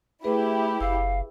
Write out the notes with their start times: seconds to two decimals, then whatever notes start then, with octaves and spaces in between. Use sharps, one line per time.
0.24 A3 E4 G4 G#4 B4
0.81 F#1 F5 E6